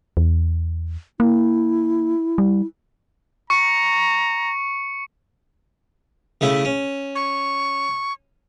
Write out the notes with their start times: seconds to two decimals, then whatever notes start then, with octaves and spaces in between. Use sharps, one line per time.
0.17 E2
1.20 A#3 E4
2.38 G3
3.50 A#5 C#6 C#7
6.41 C#3 A3 E4
6.65 C#4
7.15 C#6